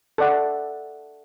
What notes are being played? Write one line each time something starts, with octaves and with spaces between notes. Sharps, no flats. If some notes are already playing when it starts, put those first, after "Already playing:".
A4 D5 F#5